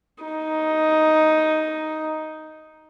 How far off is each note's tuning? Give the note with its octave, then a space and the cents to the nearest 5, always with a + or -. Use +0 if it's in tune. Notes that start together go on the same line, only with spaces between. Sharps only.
D#4 +5